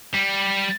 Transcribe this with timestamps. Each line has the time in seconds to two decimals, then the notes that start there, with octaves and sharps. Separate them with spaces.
0.14 G3